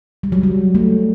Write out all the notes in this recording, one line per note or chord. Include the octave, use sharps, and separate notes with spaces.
G3
F#3
G3
A3